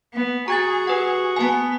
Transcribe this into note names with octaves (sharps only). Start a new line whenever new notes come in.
B3
F#4 G#4 A#5 G#6 A6
G4 B4 F#5
B3 G#5 A5